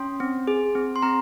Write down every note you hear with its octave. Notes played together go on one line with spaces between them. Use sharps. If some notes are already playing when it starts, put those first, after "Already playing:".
Already playing: C#4 C6
C4
G#4
C4
C6
C4 A#5